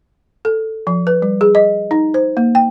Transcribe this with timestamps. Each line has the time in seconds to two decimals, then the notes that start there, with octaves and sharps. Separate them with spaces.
0.45 A4
0.87 F3
1.07 B4
1.22 G3
1.41 G#4
1.55 D#5
1.91 D#4
2.14 C5
2.37 A#3
2.55 G5